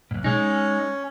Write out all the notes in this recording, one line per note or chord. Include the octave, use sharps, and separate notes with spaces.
B1 G#2
G#3 C#4 D#4